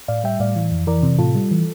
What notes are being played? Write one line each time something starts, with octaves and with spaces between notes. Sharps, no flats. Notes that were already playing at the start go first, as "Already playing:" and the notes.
A2 D5 F5
G3 E5 G5
A2 D5 F5
E3
F2
E3 A#4 D5
C3
A2 F4 A4
G3
E3